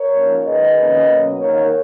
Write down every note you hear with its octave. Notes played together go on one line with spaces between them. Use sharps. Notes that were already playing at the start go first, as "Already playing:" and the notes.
Already playing: A#4 C#5
G#2 F3 A#3 C#4
G#2 D#3 G#3 B4 D#5
F2 D#3 A#3 C#4
B2 F#3 A#3 C#4
G#2 D#3 A#3 A#4 C#5